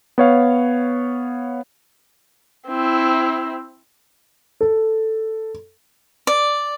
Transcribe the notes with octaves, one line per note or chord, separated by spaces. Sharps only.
B3 C#5 F5
C4 E4
A4
D5